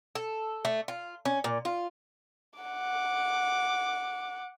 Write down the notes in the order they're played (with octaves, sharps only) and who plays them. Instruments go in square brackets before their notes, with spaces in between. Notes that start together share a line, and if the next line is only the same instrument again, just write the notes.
[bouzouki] A4
A3
F4
C#4
A#2
F4
[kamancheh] F#5 D6